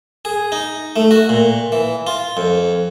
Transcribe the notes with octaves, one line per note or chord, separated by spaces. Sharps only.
G#4
D#4
A3
F#4
A#2
E3
F4
F2